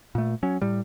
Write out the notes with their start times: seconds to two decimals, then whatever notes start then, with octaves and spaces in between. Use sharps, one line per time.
0.15 A#2 A3
0.43 F#3 C#4
0.62 A2 G3